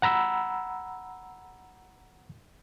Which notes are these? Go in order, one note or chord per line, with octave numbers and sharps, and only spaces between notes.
F#5 A#5 B5 E6